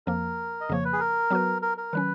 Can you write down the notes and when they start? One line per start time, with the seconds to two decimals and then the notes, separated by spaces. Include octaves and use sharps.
0.07 F2 F3 A#3 A#4
0.61 D#5
0.69 F2 C#3 F3 A#3 C#5
0.85 B4
0.93 G#4
1.00 A#4
1.30 F#3 B3 F#4 B4
1.62 A#4
1.78 A#4
1.93 D#3 F#3 C#4 B4